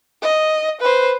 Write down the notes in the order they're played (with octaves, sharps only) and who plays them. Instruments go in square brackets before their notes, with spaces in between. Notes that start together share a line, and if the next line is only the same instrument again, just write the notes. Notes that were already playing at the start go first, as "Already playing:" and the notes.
[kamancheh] D#5
B4 C5